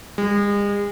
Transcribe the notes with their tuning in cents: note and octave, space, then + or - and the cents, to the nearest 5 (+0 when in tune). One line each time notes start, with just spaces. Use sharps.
G#3 -40